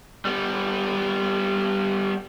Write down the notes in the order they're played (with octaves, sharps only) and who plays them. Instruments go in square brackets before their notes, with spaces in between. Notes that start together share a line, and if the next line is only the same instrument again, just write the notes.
[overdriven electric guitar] G3 B3